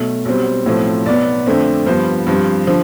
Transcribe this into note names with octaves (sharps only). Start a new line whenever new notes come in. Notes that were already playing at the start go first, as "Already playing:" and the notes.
Already playing: B1 B2 A3
B1 B2 G3 C4
B1 A2 F3 A3 C4
B1 B2 B3 D5
F2 D3 A3 C4
G2 F3 B3 C5
G2 F3 C4
D3 F3